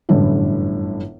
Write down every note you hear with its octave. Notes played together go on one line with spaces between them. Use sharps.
G1 F#2 A2 D3 E3